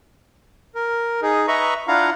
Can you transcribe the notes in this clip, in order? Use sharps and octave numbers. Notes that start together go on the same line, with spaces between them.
A#4
D#4 G#4
B4 D#5 E5 A#5 B5 C#6
D4 E4 F4 F5 F#5 A#5